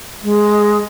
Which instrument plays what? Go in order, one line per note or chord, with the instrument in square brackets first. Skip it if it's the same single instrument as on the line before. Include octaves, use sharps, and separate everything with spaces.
[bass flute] G#3